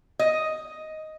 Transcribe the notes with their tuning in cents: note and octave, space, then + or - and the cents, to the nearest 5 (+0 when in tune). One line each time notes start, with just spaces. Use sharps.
D#5 +5